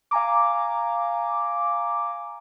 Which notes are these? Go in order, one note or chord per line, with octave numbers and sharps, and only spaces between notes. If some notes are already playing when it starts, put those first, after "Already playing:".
F5 G#5 A#5 D6